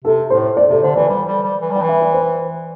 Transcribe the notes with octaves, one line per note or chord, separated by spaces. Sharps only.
C3 A4
A2 C5
D5
C3 A4
D3 C5
E3 D5
G3
G3
G3
E3
G3 G5
E3
E5
D5
C5